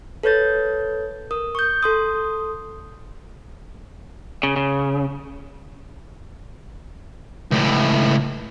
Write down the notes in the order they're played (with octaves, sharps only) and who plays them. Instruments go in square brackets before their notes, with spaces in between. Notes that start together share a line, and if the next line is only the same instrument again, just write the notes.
[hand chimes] A4 B4 C#5 G6 A6
A#4 D#6
C#6 G6
A4 C6 D#6
[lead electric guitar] C#3
C#3
[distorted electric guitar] C#2 A2